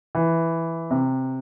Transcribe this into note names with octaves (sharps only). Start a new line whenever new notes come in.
E3
C3